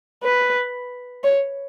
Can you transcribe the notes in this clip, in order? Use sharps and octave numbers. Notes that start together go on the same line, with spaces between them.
B4
C#5